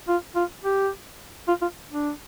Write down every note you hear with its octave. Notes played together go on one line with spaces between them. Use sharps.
F4
F4
G4
F4
F4
D4